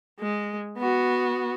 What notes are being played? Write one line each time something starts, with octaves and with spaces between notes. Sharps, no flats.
G#3
B3 F#4